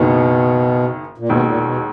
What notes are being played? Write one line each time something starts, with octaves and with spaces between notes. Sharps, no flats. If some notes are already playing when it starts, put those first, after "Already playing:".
Already playing: F#1 F#2 B2 D#3
A#2
E1 D#2 B2 D#3
A#2
B2